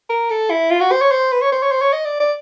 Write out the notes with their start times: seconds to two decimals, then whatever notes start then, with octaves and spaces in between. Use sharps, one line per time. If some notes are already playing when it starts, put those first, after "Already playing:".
0.10 A#4
0.31 A4
0.50 E4
0.71 F4
0.80 F#4
0.91 C5
1.02 C#5
1.11 C5
1.32 B4
1.42 C#5
1.52 C5
1.63 C#5
1.72 C5
1.82 C#5
1.93 D#5
2.06 D5
2.20 D5